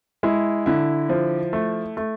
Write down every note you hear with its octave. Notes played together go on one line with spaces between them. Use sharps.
G#3 E4
D3 E4
F3
A3
A3